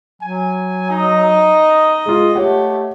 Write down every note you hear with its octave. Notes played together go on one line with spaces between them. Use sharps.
F#3 G#5
D#4 D#5
G#3 F4
A3 G4 C#5 F#5